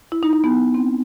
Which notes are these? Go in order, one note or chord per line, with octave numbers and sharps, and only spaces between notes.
E4
D#4
D#4
B3
C4